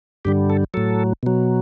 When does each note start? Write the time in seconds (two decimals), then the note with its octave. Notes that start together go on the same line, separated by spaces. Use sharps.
0.25 G2 D3 G3 G4
0.50 A4
0.74 A2 F#3 A4
1.23 B2 F#3